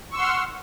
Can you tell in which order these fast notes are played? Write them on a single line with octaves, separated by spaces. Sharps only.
C#6 E6 C6 F#5 F6